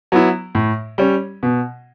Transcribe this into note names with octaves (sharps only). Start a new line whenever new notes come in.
F#3 B3 E4
A2
G3 C#4
B2